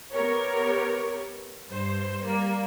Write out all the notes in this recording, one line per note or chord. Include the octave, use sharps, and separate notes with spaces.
B3 G4 A#4 C#5
G2 C5
G3 A#3